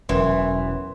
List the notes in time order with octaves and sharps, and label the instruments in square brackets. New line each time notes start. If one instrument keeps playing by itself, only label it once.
[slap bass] E1 [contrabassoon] F#2 [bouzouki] E3 [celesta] A#4 B4 C6